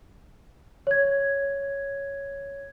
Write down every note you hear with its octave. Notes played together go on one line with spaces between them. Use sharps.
C#5 G#6